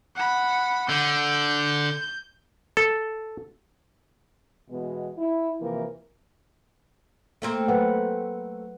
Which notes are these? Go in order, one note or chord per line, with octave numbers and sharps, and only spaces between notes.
F#5 B5
D3 G6
A4
B2 E3 G#3 B3
E4
C3 E3 F3 A#3 A#4
A3 A#3 C4
F#3 B4 F#5